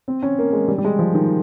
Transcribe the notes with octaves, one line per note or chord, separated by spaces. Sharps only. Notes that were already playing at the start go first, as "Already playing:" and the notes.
C4
C#4
A#3
G#3
G3
G3
G#3
F3
D#3